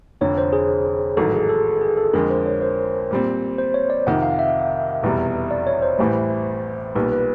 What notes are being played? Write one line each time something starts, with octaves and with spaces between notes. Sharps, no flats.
F1 F2 D3 C#5
C5
G#4
A1 G#2 D#3 F#3 A4
G#4
A4
G#4
A4
F2 D3 F3 G#3 A#4
C5
C#5
C5
A#2 G3 C4
C5
C#5
D5
F2 C3 D#3 F#5
F5
E5
F1 E2 B2 G3
D5
C#5
C5
A1 A2 E3 G3
B1 A#2 G3 B4
B4